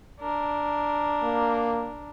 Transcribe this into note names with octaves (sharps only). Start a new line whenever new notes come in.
D4 A#4
A#3